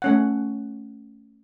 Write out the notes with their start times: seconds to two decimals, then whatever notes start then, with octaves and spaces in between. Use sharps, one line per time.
0.02 A3 C#4 F#5